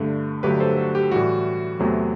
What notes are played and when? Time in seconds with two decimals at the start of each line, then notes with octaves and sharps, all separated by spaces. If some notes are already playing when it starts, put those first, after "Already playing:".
Already playing: G2 D3 A3
0.43 G2 D3 F#3 A3 G4 B4
0.60 A4 C5
0.77 F#4 A4
0.95 G4
1.11 A2 E3 G3 F#4
1.80 E2 C3 F#3 A3